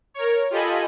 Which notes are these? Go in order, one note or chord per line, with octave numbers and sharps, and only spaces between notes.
A#4 C#5
F4 G4 A4 D#5 G#5 B5